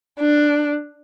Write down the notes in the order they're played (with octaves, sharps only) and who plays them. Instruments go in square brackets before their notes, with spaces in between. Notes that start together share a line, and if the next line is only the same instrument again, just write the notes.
[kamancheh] D4